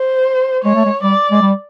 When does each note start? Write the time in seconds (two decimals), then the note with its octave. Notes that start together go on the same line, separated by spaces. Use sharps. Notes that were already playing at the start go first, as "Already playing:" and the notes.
Already playing: C5
0.64 G#3 C#5
0.75 A3
0.85 G#3
1.03 G3 D5
1.32 G#3
1.41 G3